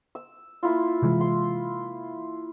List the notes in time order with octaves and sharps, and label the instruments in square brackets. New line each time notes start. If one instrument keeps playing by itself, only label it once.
[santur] E6
A#3 E4 F4
[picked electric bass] C3 E3 G#3
[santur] C6